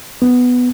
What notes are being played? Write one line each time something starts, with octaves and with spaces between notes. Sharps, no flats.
B3